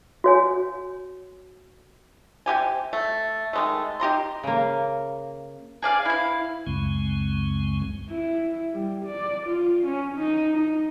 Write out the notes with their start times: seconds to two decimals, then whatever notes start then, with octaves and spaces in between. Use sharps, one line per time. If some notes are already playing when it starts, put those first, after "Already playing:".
0.24 F#4 C#5 G#5
2.46 C3 D#4 G4 G#5
2.93 A3
3.53 D#3 G#3 A3
4.00 D#4 G4 A#5 C6
4.43 C#3 A#3
5.82 G#4 D5 F5
6.05 E4 F5
6.67 C#2 F#2 C#3 G#3 C4
8.10 E4
8.73 G3
9.05 D5
9.46 F4
9.86 C#4
10.18 D#4
10.53 D#4